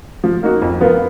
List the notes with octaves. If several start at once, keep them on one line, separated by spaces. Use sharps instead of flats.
F3
A#3 D#4 F#4
F2
F3 B3 F4 A#4